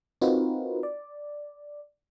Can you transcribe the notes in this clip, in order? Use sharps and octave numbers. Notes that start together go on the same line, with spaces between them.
C4 D#4 F4 F#4 A#4 B4
D5